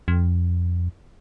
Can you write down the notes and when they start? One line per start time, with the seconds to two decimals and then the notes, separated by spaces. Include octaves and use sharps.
0.08 F2